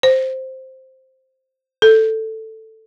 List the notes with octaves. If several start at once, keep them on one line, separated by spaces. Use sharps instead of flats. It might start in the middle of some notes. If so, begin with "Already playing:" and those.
C5
A4